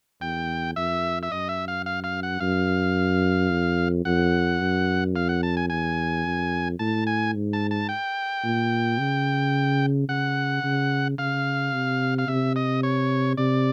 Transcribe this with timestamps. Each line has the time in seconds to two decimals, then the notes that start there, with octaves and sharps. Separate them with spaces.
0.21 E2 G5
0.76 F2 E5
1.23 E5
1.31 F#2 D#5
1.49 E5
1.68 F5
1.86 F5
2.04 F5
2.23 F#5
2.40 F#2 F5
3.51 F2
4.05 F2 F#5
4.60 F#2
5.15 F2 F5
5.29 F#5
5.43 A5
5.57 G#5
5.70 E2 G#5
6.25 F2
6.79 A2 A5
7.07 G#5
7.35 G#2
7.53 A5
7.71 A5
7.89 G5
8.44 A#2
8.99 C#3
10.09 C#3 F#5
10.64 C#3
11.18 C#3 F5
11.73 C3
12.18 F5
12.28 C3 E5
12.56 D#5
12.83 C#5
13.37 C3 D5